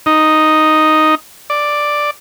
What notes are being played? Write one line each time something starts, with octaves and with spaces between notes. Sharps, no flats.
D#4
D5